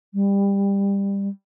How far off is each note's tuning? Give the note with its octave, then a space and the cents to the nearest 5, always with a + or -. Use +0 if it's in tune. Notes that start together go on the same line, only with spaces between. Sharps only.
G3 +20